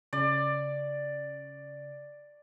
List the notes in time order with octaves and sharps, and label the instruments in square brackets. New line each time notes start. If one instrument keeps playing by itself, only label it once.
[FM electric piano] C#3 [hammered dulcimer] D5